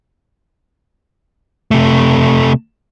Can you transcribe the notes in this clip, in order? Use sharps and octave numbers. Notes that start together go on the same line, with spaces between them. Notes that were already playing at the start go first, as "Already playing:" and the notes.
C3 A3